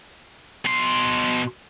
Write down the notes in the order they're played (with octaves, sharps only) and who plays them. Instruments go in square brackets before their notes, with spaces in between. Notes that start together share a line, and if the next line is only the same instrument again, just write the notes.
[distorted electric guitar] B2 C6